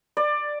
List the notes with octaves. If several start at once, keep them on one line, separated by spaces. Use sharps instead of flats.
D5